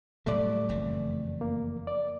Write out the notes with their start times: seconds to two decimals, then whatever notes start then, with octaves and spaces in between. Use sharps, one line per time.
0.26 A2 F#3 G3 A3 D5
0.69 F#1 F2 E3
1.41 A#3
1.87 D5